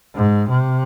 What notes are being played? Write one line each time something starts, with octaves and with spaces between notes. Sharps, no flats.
G#2
C3